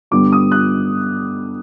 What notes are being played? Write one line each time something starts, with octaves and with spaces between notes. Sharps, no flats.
G2 D3 G3 B3 D6
D#6
F#6